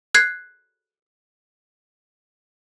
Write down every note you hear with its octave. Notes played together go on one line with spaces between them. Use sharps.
F#6 G#6 C7